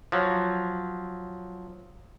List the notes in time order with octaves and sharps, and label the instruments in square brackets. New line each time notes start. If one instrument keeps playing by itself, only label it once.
[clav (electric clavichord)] F3 F#3